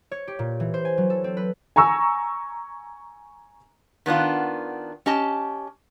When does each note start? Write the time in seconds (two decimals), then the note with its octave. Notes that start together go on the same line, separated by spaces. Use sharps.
0.11 C#5
0.28 G4
0.39 A#2
0.60 E3
0.74 C5
0.85 G#5
0.98 F#3
1.10 A4
1.24 C4
1.37 B4
1.76 G#5 A#5 C#6 E6
4.06 D#3 B3 D4 F4
5.06 C#4 G4 D#5 A5